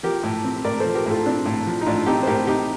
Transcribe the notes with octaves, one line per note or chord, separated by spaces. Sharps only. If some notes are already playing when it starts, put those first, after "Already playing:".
F3 G4 A#4
A2
C4
A2 A#4 D5
F3 A4 C5
G4 A#4
A2 F4 A4
C4 D4 F4
A2
F3
D#4
A2 D4 F4
C4 D#4 G4
C5
A2 G4 A#4
C3 D#4 G4